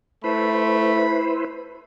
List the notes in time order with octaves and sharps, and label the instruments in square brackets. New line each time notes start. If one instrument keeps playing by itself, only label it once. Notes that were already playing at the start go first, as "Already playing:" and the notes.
[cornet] A3 [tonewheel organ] E4 B4 C5 [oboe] B5